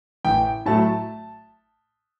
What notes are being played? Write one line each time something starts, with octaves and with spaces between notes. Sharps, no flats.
A1 G5
A2 F#3 A3 A5